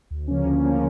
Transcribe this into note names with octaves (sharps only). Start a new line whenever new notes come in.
D2
C#3 F3 A#3 C#4
D2
C#3 F3 A#3 C#4